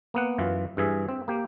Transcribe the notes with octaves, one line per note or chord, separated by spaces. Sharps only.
A#3 B3 F#5
F#2 E3 F4
G2 E3 G#4 E5
C4
A#3 G4